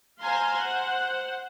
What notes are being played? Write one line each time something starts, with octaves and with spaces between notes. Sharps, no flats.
C5 F5 G#5 A#5 C6
C5 F#5